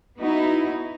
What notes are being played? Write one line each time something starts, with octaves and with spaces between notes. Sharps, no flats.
B3 D#4 E4 F#4